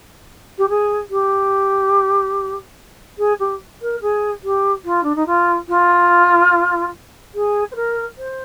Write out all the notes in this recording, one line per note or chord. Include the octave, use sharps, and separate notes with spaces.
G4
G#4
G4
G#4
G4
A#4
G#4
G4
F4
D4
D#4
F4
F4
G#4
C5
A#4
C5